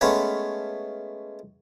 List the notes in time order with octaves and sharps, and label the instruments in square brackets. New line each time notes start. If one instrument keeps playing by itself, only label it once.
[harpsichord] G#3 A3 B3 C#4 B4 G#5